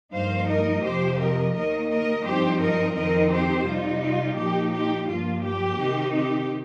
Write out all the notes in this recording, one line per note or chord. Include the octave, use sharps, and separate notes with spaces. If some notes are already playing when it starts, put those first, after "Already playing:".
G2 F3 A#3 D#4 C5 F5
A#4 D#5
F2 C3 F3 G4 C5
A#4 D#5
D#2 D#3 A#3 A#4 D#5
A#4 D#5
G2 F3 C4 D#4 G4 C5
A#4 D#5
F2 D#3 C4 D#4 A#4 D#5
G4 C5
C3 G3 D#4 F4
F4
A#2 F3 D#4 G4
G4
G2 F3 A#3 F4
G4
C3 D#3 C4 D#4
G4